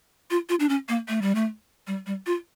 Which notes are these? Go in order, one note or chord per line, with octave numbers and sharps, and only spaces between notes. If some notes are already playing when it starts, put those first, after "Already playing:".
F4
F4
D4
C#4
A#3
A3
G3
A3
G3
G3
F4